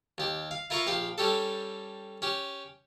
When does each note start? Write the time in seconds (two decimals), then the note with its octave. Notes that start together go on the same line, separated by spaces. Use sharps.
0.18 D#2 G4
0.51 F5
0.70 E4 F4 A#4 F5 C#6
0.87 A#1 G4 F5
1.18 G3 C#4 G4 A4
2.22 C#4 G4